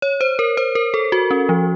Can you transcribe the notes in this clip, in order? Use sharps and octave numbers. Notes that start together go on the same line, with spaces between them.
C#5
C5
A#4
C5
A#4
A4
F#4
C#4
F3